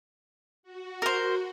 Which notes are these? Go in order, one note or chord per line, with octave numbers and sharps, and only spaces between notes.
F#4
A#4 C5